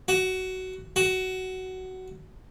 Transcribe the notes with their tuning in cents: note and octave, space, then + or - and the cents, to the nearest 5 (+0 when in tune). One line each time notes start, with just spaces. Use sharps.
F#4 +15
F#4 +15